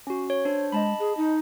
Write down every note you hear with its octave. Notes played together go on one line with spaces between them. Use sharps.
C#4 F#4
C#5
D4 C5
G#3 D#5 A5 B5
G#4
D#4